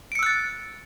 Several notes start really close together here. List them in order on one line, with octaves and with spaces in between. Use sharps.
D7 C#7 E6 F#6 A6